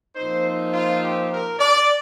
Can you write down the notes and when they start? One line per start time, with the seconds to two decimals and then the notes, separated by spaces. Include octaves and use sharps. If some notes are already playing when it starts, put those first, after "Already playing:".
0.15 A#2 F3 C4 D#4 C5
0.72 F4
1.00 G4
1.30 A#4
1.58 D5